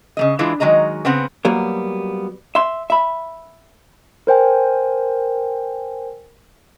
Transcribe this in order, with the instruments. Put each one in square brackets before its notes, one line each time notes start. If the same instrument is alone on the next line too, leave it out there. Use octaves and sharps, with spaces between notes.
[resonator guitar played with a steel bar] C#3 A3 D#5
E3 G#3 D4 E4 F4
D#3 F#3 G#3 D#5 A#5
C#3 B3 C4 F#5
[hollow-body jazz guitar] F#3 G3 A#3 B3
E5 C6
E5 B5
[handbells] A#4 C5 G5 G#5